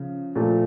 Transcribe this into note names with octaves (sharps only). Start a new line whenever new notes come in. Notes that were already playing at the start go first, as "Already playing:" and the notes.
Already playing: C#3 F3
A#2 F3 A3